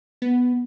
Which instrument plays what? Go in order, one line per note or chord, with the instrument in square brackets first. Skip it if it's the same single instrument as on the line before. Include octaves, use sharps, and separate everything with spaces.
[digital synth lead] B3